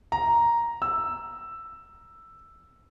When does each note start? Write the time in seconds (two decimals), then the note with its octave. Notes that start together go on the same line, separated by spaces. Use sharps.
0.12 A#5
0.82 E6